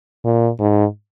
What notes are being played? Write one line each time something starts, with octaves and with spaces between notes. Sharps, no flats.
A#2
G#2